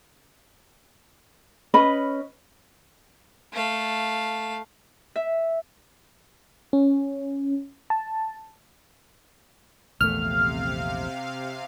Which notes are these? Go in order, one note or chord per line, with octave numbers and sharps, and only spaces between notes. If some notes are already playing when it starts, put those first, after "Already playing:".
C#4 B4 D#5 B5
A3 F5
E5
C#4
A5
A#1 E2 C3 A3 F5 F6